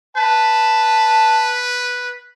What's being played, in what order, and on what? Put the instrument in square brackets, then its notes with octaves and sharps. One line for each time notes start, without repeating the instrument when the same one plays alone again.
[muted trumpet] B4 [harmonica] A5